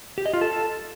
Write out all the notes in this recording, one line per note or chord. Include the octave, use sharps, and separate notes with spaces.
G4
D#5
F4
A4